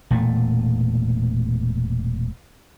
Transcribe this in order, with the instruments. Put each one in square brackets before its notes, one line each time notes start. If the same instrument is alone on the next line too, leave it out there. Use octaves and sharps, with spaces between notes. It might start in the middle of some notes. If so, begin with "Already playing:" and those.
[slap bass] E1 A#2 A3